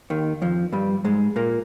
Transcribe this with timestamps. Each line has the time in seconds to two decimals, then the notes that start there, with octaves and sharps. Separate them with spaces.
0.10 D#2 D#3
0.42 F2 F3
0.72 G2 G3
1.04 G#2 G#3
1.36 A#2 A#3